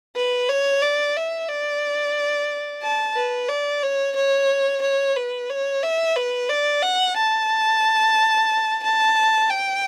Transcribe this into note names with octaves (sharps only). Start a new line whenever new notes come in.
B4
C#5
D5
E5
D5
A5
B4
D5
C#5
C#5
C#5
B4
C#5
E5
B4
D5
F#5
A5
A5
G5